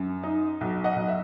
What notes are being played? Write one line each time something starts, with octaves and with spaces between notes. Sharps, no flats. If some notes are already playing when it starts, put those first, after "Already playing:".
Already playing: F#2
D#4
B1
D#5 F#5
B1
E5